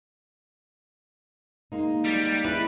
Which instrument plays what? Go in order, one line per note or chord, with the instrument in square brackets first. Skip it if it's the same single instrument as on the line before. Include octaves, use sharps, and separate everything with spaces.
[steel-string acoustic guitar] G#3 A#3 D#4
[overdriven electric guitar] G3
[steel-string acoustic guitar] G#3 C#4 E4 [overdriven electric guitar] B4